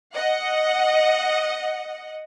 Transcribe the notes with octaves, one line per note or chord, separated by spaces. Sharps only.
D#5 F#5